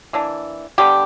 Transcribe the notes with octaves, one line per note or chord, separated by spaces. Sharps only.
E3 A#3 D4
D3 G3 B3 G4